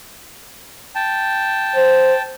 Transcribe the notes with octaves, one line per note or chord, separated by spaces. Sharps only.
G5 A5
C5